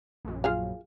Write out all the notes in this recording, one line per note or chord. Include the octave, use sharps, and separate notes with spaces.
A#1 F#2
F4 G#4 F5